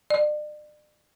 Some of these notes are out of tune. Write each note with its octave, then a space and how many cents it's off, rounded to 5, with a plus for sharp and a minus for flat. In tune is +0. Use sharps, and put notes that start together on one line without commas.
D5 +40